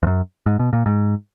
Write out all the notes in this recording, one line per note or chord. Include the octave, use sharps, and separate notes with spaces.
E2
F#2
G#2
B2
A#2
G#2